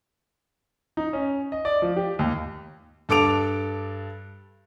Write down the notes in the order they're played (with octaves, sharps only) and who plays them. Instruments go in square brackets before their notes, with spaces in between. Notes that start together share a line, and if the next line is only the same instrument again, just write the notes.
[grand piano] D#4
C#4
D#5
D5
F3
G4
D#2
G2 A4 D6 D7 F7